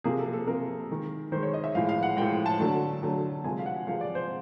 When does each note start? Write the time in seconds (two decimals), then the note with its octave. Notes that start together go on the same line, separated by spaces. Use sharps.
0.04 C3 F3 A#3 G#4
0.19 A4
0.33 A4
0.47 C3 F3 A#3 A#4
0.90 D#3 G#3
1.32 D#3 G#3 C5
1.43 C#5
1.54 D#5
1.64 E5
1.75 A2 F3 G#3 F5
1.89 F5
2.03 F#5
2.17 A2 F3 G#3 G5
2.46 A5
2.59 D3 F#3 A3
3.03 D3 F#3 A3
3.44 C3 F3 G#3 G#5
3.59 F5
3.66 F#5
3.87 C3 F3 G#3 F5
4.01 D5
4.15 C5